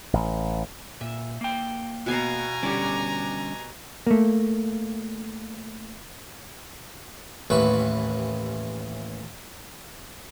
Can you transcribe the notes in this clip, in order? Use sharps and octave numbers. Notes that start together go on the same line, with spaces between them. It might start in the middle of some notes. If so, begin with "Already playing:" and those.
A1
A#2 E5
A#3 G5
B2 B3 F5 G#5 A#5
D3 G3 C#4 G4 D5
A3 A#3
A1 D#2 E3 B4 B5 C#6